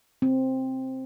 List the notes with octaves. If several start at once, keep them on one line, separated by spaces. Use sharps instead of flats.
C4